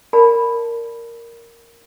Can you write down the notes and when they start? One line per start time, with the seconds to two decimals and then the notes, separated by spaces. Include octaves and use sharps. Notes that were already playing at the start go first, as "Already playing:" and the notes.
0.13 A#4 D5 A5 B5